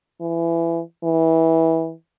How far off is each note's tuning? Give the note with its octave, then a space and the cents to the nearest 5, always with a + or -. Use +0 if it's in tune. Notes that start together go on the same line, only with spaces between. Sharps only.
E3 +25
E3 -20